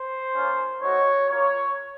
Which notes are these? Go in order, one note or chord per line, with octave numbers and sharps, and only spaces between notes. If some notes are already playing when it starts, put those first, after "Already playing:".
Already playing: C5
A#3 C#4 F4
A3 D#4 F#4 C#5
A#3 F4 C#5